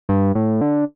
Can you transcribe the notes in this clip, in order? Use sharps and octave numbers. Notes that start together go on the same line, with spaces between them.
G2
A2
D3